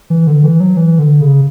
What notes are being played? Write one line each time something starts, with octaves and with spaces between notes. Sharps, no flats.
E3
D3
E3
F#3
E3
D3
C#3